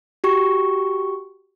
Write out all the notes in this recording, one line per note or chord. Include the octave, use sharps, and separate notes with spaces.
F#4 G4 C#6